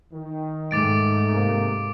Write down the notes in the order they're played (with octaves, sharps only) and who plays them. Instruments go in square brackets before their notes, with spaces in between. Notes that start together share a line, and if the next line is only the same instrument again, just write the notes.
[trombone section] D#3
[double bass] G#2 A3 [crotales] D6 A6 D7
[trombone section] C3 A#3